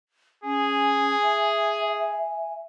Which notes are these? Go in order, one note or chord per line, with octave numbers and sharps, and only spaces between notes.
C#4 G#4 G#5
E5